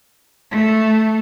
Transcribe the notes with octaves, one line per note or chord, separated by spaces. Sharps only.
A3